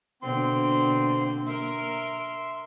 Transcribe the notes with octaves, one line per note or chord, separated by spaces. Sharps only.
B2 D3 A#3 C4 C6
A#4 E5 C6